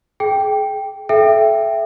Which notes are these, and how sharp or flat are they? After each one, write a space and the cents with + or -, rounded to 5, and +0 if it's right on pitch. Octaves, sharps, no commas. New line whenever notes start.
G#4 +30 G5 +0
A4 -40 E5 +15 G5 +0